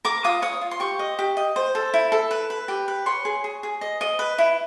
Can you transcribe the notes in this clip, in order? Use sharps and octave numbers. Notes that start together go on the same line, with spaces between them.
A#4 D6
F4 D#6
C#5 D#6
F4
C6
G4 C#6
D#5
G4
D#5
C5
A4
E4
A4
B4
B4
G4
B4
C#5 C6
G#4
G#4
G#4
D#5
D#5
B4
E4